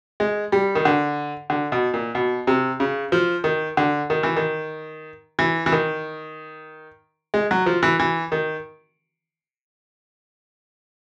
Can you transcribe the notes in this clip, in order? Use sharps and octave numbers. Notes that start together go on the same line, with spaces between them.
G#3
G3
D#3
D3
D3
B2
A#2
B2
C3
C#3
F3
D#3
D3
D#3
E3
D#3
E3
E3
D#3
G#3
F#3
F3
E3
E3
D#3